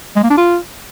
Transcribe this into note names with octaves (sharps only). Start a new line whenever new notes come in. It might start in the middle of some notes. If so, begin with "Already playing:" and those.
G#3
A#3
D4
F4